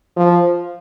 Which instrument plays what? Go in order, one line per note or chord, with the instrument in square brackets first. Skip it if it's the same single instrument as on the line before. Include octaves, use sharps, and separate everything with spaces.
[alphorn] F3